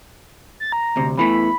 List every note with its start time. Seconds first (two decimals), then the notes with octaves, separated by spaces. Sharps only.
0.60 A6
0.72 A#5
0.96 D2 C3
1.17 E2 E3 A3 B5